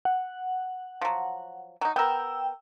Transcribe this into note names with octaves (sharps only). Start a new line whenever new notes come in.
F#5
F3 F#3
F#3 D#4
B3 A#4 G5 E6